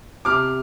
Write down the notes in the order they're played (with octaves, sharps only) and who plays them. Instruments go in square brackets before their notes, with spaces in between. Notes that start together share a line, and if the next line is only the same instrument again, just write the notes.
[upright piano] C3 D6 F6